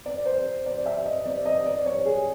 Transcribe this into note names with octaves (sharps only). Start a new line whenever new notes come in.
D5
C5
D5
E5
D#5
D5
D#5
D5
C#5
G#4